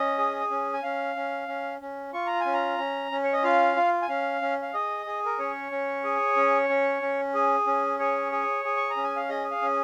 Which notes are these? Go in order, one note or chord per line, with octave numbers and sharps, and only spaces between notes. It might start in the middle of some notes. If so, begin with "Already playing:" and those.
Already playing: C#4 D#5
G#4
C#4
G#5
C#4 F5
C#4
C#4
C#4
F4 C#6
A#5
G#5
C#4
A#5
C#4
C#4
C#5
D#5
F4 F5
F4
G#5
C#4 F5
C#4
F5
G#4 D#5
G#4
A#4
C#4 C#5
C#4
G#4
C#4
C#4
C#4
G#4
C#4
G#4 C#5
G#4
G#4
C#6
A#5
C#4
G#5
F5
G#4 D#5
F5
C#4